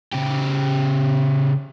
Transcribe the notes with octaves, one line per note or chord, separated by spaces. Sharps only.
C#3 G4